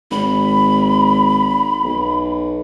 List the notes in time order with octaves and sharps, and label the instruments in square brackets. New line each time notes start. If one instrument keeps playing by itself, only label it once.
[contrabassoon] G#1 [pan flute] B5
[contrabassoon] B1